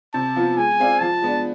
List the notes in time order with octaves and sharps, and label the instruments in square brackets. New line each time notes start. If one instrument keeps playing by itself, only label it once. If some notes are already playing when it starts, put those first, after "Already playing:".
[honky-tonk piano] C3 [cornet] A5
[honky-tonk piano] F3 B3 F4
[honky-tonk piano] G#3 [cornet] G#5
[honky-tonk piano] C4 G#4 D5 F5
[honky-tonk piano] F3 [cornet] A5
[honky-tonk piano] G#3 B3 D4